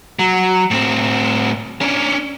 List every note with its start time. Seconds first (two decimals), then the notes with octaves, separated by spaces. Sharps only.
0.19 F#3
0.71 A2 C4
1.81 C#4 D4